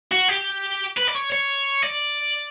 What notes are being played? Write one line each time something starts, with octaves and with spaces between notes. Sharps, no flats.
F#4
G4
B4
D5
C#5
C#5
D5